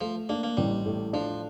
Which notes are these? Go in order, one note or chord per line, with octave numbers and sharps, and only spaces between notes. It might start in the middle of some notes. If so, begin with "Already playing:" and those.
F3 A3
A#3 D4
A#3
A1 G3
A2
F3 D4